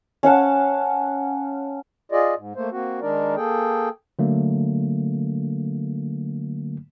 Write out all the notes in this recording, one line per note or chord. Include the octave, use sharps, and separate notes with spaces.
C#4 F5 F#5 A5
F4 G#4 D5 D#5
G#2
A3 A#3 C5
A#3 C4 F#4
D#3 G#3 D4 D#4 A#4 D5
A#3 G#4 A4 G5
D3 F#3 A3 A#3